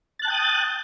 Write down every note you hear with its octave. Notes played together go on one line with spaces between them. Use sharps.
G5 A5 D#6 F#6 A6